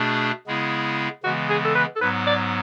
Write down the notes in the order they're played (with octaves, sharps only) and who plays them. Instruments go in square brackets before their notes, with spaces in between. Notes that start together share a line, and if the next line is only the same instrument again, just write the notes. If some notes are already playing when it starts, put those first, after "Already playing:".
Already playing: [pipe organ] B2 A3 D4 G#4
C#3 G#3 B3 E4 G#4
[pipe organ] C#3 E3 G#3 B3 [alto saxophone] F#4
[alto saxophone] G#4
A4
B4
A4
[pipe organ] G#2 F#3 B3 [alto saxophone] B4
[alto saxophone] D5